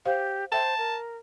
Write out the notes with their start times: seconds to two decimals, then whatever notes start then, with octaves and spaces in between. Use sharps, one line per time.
0.06 G4 C5 F5
0.52 C5 E5 G5 A5
0.78 A#4